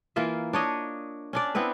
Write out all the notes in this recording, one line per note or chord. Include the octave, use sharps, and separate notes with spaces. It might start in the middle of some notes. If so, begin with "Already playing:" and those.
E3 A#3 F4 E5
D4 C#5 D#5
C#4 D4 D5
B3 C4 E4 B4